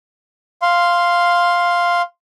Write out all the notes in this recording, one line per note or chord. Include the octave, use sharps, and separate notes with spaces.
F5 C6